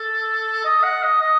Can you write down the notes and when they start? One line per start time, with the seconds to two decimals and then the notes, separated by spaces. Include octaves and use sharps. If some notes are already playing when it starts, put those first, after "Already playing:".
Already playing: A4
0.65 D#5
0.83 F#5
1.03 D#5
1.22 D#5